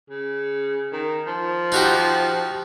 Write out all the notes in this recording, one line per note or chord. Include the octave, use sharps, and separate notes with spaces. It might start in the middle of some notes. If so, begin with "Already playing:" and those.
C#3
D#3
F3
D#4 F#4 G4